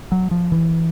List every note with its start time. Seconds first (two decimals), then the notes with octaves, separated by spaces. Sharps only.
0.12 F#3
0.31 F3
0.52 E3